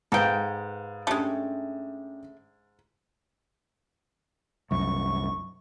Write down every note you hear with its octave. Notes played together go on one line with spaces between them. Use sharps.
G#2 A4 B4 F5 G5 D#6
G#3 A3 C#4 D4 G4
C2 F#2 C#6